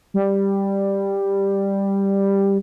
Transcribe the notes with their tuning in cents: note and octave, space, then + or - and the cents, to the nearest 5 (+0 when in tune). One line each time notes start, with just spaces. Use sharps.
G3 +5